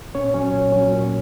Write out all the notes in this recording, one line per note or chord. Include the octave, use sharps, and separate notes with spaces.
A#2 C#4 C#5
F#3 C#4
A#2
F#3 C#4
A#2